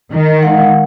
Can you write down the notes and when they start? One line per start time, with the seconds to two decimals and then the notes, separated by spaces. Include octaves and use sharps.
0.12 D#3
0.43 G#3 F5 F#5